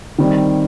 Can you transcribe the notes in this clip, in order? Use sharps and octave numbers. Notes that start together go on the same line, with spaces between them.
D#3 G3 C4